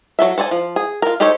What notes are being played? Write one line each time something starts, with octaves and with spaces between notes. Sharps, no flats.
F#3 A4 E5
A4 C5 D5 G#5
F3
G#4
F4 A#4
D#4 G4 A4 C5 C#5